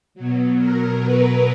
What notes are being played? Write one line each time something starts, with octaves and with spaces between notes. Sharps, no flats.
B2 F#3
A#4
B4